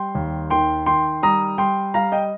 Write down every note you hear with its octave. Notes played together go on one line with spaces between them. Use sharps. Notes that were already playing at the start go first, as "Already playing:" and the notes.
Already playing: G3 G5 C6
D#2
D#3 G5 C6
D#3 G5 C6
G3 A#5 D#6
G3 G5 C6
G3 F5 A#5
D#5 G5